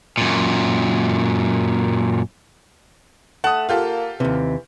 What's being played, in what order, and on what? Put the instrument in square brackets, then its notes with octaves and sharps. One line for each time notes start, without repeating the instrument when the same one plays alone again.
[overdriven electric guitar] F#2 A#2
[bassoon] A3 [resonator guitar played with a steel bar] F#5 [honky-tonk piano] A5 D#6
[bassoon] A#3 [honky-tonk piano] F4 G4 A4
[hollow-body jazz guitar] D#2 C3 [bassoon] E3